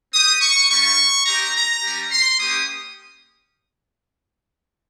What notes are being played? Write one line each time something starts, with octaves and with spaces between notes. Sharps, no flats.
C4 G4 D#6
C#6
G3 C#4 F4 C#6
C4 D#4 G4 A#5
A#5
G3 C#4 G4
C6
A#3 C#4 G4 D#6